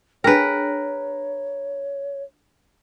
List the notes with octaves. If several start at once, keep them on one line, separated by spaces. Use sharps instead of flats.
D4 G#4 A#4 B4 C#5 G5